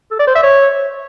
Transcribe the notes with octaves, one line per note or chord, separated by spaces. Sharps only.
A4
D5
C5
E5
C#5